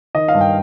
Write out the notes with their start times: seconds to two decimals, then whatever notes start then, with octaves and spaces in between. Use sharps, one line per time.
0.15 D#3 D#5
0.28 F5
0.34 G2
0.41 G5